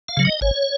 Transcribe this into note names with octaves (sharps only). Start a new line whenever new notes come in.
F5
C#3 F#3
D#5
G#1 C#5